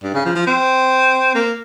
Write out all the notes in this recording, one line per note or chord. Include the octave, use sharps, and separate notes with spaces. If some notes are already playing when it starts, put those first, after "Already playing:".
G2
C#3
F3
F3
C4
A#3